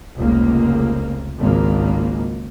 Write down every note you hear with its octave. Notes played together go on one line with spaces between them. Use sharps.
F1 C#2 A#3
G#1 C#2 A#3